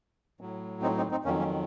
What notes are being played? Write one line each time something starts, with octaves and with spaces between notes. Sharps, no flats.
A2 F#3
C4 D#4
C4 D#4
C4 D#4
F2 D#3 F#3 A#3 C#4
A#3 C#4